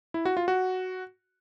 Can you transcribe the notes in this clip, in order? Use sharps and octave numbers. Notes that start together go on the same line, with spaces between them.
E4
F#4
F4
F#4